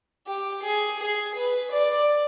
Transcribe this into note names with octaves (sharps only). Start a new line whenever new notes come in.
G4
G#4
G#4
B4
D5